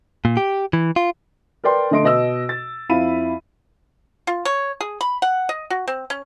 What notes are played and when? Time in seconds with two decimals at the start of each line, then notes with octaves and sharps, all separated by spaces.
0.25 A#2
0.37 G4
0.73 E3
0.96 F4
1.64 A#4 B4 D5 G5 C6
1.91 D3 A3 D#5 C6 D7
2.03 B2 D#5 E6
2.49 A6
2.89 F2 E4 F5 B5 D#7
4.27 F4
4.45 C#5
4.81 G#4
5.01 B5
5.22 F#5
5.49 D#5
5.70 F#4
5.88 C4
6.10 C#4